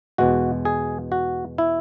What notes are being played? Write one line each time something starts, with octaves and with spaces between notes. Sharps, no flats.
E2 B2 G#3 F#4
G#4
F#4
E4